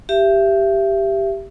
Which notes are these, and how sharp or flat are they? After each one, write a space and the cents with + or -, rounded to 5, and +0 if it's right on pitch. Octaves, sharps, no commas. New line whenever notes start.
G4 +0 E5 +30